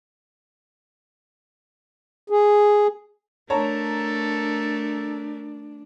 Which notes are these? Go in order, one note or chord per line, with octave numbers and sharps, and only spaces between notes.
G#4
A3 D4 A4 A#4 C#5 A5 A#5